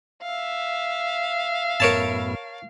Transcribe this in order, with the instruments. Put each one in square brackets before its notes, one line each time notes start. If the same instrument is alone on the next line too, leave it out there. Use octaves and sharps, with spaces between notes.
[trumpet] E5 [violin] F5
[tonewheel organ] F#2 A2 B3 [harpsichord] A#4 C#5 A5